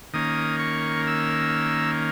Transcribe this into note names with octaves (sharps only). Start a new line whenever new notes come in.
D#3 A#3 C#4 D#6
C#6
E6